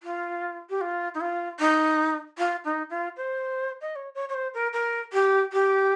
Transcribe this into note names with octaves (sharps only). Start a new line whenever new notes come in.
F4
G4
F4
D#4
F4
D#4
F4
D#4
F4
C5
D#5
C#5
C#5
C#5
C5
A#4
A#4
G4
G4